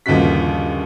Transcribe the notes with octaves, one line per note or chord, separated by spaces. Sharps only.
G1 D#2 C#3 F3 F#4 B6